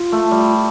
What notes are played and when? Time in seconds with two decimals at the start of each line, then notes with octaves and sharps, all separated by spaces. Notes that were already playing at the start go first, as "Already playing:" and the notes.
Already playing: F4
0.12 A3
0.31 G3